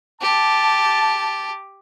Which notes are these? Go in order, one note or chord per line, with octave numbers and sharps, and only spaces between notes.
G4 A5